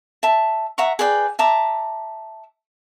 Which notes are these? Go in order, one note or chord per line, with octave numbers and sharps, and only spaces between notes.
E5 A5
E5 F#5 A#5 C#6
G#4 B4 D5 G5
E5 A5 A#5 D6